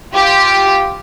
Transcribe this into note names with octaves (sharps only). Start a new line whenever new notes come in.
F4 G4